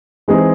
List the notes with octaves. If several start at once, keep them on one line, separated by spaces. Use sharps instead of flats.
E3 G#3 C4 D#4 G#4